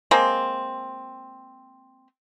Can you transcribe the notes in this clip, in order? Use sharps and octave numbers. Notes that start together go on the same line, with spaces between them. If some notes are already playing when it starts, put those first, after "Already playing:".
G#3 A#3 C4